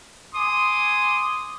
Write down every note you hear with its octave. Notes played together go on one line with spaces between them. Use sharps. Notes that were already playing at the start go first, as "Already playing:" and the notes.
G#5 C6 D6 D#6